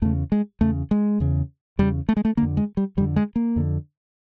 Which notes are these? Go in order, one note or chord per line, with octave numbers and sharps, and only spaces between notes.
E2 C#3 A3
G#3
E2 C#3 A3
G#3
E2 C#3
E2 C#3 G3
A3
G#3
A3
F2 D3 A#3
G#3
G3
F2 D3 G3
G#3
A#3
F2 D3